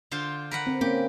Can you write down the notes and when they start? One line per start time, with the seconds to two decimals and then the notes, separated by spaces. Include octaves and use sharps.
0.11 D3 F4 C5
0.51 A#4 B4 F#5
0.67 C4
0.81 A#3 C4 C#4 G4